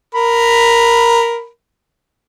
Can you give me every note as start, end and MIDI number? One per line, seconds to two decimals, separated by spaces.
0.15 1.48 70
0.15 1.48 83